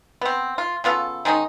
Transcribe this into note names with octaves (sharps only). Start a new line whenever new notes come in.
B3 C4
F4
C#3 B3 F4 A4
D#3 G#3 C#4 D#4